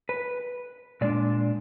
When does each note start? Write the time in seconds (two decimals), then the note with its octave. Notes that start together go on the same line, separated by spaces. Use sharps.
0.09 B4
1.01 A#2 G#3 D4 D5